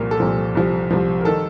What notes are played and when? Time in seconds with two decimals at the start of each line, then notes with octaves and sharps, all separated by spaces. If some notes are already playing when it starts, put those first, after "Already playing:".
Already playing: C2 A#2 F3 A#4
0.11 A4
0.20 C2 A#2 F3
0.55 C2 C3 F3
0.91 C2 C3 F3
1.21 A#4
1.25 D#3 A4